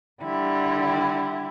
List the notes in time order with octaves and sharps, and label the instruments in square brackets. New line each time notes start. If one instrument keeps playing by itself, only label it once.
[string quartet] D3 G3 E4